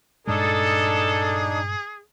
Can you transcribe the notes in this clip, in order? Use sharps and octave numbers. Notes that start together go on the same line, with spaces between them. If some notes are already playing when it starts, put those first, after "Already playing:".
G2 A#2 G#3 D4 D#4 G#4 A4